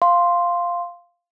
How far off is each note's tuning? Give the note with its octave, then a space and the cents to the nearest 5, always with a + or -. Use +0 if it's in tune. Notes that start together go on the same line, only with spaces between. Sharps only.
F5 +0 C6 +0